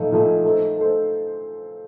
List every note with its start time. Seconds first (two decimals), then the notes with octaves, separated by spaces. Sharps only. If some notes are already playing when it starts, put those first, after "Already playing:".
Already playing: A#2 F3 A3 D#4
0.12 A#2 F3 A3 D#4
0.44 A3 D#4 A4 C5
0.77 A3 D#4 A4 C5